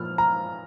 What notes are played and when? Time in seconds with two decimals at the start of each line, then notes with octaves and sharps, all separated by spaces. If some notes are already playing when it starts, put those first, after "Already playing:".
Already playing: A#2 F3 A#3 F6
0.18 A#5